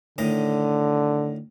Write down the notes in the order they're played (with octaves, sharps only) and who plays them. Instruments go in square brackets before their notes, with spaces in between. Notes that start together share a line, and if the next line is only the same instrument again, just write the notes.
[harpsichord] A2 D#3 D#5 [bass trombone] D3